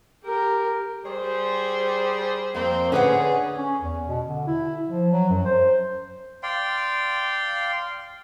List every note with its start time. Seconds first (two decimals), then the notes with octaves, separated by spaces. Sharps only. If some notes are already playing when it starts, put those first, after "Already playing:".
0.24 G4 A#4
1.05 G3 G#4 C5
2.55 F2 A#3 C4 C5
2.92 D3 C#4 G#4 B4 F#5
3.58 C#4
3.81 E2
4.08 B2
4.26 D3
4.47 E4
4.89 F3
5.12 F#3
5.30 F#2
5.45 C5
6.43 D5 F5 G5 C6